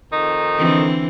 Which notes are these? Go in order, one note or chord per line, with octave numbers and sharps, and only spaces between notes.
F2 D#3 D#4
D3 E3 C4